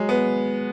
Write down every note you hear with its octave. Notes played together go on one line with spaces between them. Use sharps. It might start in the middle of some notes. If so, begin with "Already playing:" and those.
Already playing: F#3 G#3
B3